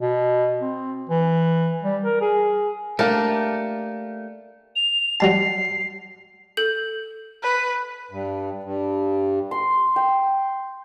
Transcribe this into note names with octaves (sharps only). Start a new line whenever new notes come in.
B2
C4
E3
G3
A#4
G#4
A3 A#3 D4 G4 A#4
F7
F#3 G3 A5 C7
A4 G6
B4
G2
G2
C6
G5